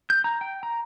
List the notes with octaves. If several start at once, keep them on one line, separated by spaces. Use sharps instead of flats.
G6
A#5
G5
A#5